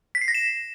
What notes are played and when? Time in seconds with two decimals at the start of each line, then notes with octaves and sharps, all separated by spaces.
0.15 B6
0.21 C7
0.28 A#6
0.35 E7